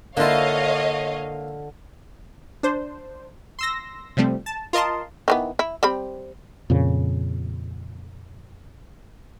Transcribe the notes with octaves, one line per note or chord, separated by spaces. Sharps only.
D3 A#3 E4 F4 C#5 D#5 F5
D4 C5
C6 E6 A#6
C3 F3 G3 A3 C4
A5
F4 A#4 D#5 A5 C6
D#3 E3 B3
E4
G3 C4 B5
F2 A#2 C#3